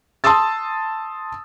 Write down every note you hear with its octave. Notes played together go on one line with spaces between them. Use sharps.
A5 C6 D#6 E6 A6